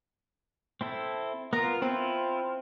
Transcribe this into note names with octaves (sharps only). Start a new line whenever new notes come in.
C4 E4 A4
B3 F4 A#4
C4 E4 F4